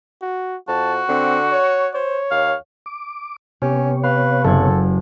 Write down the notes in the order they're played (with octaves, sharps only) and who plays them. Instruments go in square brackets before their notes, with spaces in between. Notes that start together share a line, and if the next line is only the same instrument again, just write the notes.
[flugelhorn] F#4
[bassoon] F2 [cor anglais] F#4 [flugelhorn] A5
[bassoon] D3 [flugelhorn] C4
[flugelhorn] C#5
[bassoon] C5 [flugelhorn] C#5
[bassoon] D#2 [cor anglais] F5
[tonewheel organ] D6
[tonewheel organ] C3 B3 C#5 [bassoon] C#4 [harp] G4
[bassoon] B4 [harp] F5
[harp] F#1 B4 G#6 [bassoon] A4